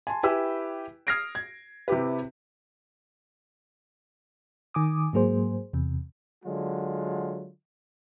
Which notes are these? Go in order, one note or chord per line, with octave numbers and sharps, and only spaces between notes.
G#5 A5 C6
E4 G4 B4 G5 G#5 E6
D#6 F6 G#6 A#6 C7 D7
G#6
C3 E4 G4 B4
D#3 G#5 D6 D#6
G#2 F#3 A#3 G#4 C5
E2 C3
D3 F#3 G#3 F4